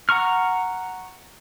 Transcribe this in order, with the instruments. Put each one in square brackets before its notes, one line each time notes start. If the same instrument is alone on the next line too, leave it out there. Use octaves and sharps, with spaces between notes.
[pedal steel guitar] F#5 A#5 C#6 F6